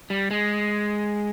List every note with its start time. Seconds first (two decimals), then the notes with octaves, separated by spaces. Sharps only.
0.10 G3
0.31 G#3